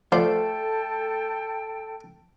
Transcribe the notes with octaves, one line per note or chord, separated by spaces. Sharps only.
F3 A3 A4 C5 D5 G5 A5